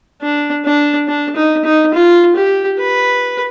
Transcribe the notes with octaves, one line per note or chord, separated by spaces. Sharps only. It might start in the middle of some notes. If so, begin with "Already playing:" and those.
D4
D4
D4
D#4
D#4
F4
G4
B4